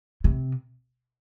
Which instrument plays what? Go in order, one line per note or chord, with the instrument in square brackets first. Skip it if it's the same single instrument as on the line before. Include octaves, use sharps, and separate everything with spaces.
[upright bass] C3